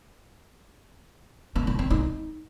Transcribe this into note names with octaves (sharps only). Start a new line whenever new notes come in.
B3
D4
C4
D#4